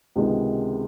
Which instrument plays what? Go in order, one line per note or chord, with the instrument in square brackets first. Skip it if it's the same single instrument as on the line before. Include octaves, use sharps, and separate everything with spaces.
[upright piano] C#2 C3 D#3 G#3 B3